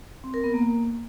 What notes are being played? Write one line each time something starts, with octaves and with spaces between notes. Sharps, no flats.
C4
A#4
B3
A#3